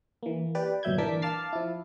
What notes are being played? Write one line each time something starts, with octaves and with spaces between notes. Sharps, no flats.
E3 A#3
G4 B4 D5
G1 A#2 F#3 E5 G6 G#6
E3 D4 A#4 A5 D6 B6
F5 A5 D6 F6 A6 C7
F3 E4